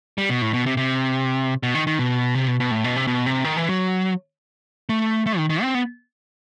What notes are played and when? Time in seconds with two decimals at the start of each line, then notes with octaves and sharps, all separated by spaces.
0.18 G3
0.30 B2
0.42 A2
0.54 B2
0.66 C3
0.77 C3
1.63 B2
1.75 D#3
1.87 D#3
1.99 B2
2.35 C3
2.47 B2
2.60 B2
2.71 A2
2.84 B2
2.96 C3
3.07 B2
3.26 C3
3.45 D#3
3.57 E3
3.69 F#3
4.89 A3
5.26 A3
5.38 D#3
5.50 D#3
5.62 C4
5.75 B3